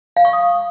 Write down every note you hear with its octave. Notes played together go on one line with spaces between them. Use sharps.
F5
C#6
D#6